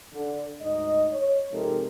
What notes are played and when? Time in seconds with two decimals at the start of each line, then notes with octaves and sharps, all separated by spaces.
0.13 D3
0.62 D2 G#2 D#4 D#5
1.12 C#5
1.52 C3 F3 G#3 D#4 A4 A#4